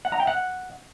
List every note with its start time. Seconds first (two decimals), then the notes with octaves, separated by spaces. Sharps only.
0.05 F#5
0.12 A#5
0.20 G5
0.27 F#5